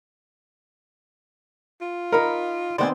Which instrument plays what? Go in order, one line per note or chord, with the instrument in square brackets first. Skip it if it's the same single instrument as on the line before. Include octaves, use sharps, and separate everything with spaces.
[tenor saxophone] F4
[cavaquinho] D#4 B5 [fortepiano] A#4
[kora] D#3 B3 C4 [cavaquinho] C5 F#5 G#5 [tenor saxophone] D5